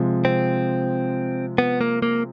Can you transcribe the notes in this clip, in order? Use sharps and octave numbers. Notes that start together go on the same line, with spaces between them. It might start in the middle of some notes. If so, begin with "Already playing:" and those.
Already playing: C3 F3 G#3
C4
B3
A#3
A#3